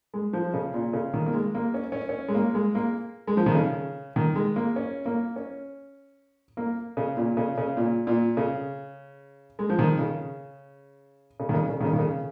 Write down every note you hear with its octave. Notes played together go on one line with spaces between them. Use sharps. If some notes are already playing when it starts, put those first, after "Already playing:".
G#3
F3
C#3
A#2
C#3
D#3
A#3
G#3
A#3
C#4
C#4
C#4
G#3
A#3
G#3
A#3
G#3
F3
D#3
C#3
D#3
G#3
A#3
C#4
A#3
C#4
A#3
C#3
A#2
C#3
C#3
A#2
A#2
C#3
G#3
F3
D#3
C#3
C#3
D#3
C#3
C#3
D#3
C#3
D#3
C#3